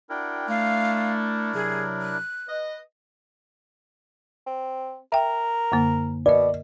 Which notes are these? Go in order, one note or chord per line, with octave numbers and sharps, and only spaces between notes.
D4 E4 F#4 A#4 F#5 G5
A3 F5
C3 F#3 G#4
F#6
B4 D#5
C4
A#4 E5 G5
F#2 D3 A#3
B2 A#4 D5 D#5